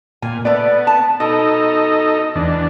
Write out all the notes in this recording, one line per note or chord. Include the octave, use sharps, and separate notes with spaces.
A#2 G#5
A3 B3 D5
A5
B2 D#4 A4 D#5
E2 D4